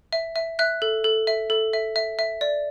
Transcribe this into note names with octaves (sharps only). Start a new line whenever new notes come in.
E5
E5
E5 F#6
A4
A4
E5
A4
E5
E5
E5
D5